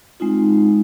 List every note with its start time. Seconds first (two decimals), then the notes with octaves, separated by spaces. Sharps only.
0.20 G#3 C4 D#4 F4